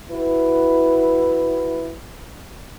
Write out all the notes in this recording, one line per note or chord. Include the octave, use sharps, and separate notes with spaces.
E4 F#4 B4